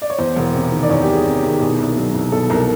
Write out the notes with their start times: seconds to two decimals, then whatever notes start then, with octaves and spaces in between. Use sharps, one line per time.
0.02 D5
0.10 C#5
0.19 E2 C5
0.36 E1
0.54 C3
0.72 D#3
0.83 D5
0.90 E2 C#5
1.02 G4
1.07 E1
1.13 G#4
1.26 C3
1.38 G4
1.43 D#3
1.52 G4
1.61 B2 G#4
1.78 C2
1.97 F#3
2.14 C2
2.32 B2 A4
2.50 C2 A#4